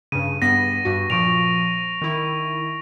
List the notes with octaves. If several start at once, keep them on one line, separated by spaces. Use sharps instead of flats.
G2 C#3 D#7
G2 B3 A#6 B6
G2 F#4
A#2 F3 C#6 D7 F7
D#3 E4